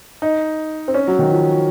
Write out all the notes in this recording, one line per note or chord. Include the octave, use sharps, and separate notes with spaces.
D#4
C4
C#4
F#3
D#3
F3